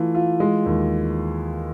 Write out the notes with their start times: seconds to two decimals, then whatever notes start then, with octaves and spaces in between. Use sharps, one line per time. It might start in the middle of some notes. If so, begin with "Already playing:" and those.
Already playing: E3 A3 F4
0.15 F4
0.40 G#3
0.66 D#2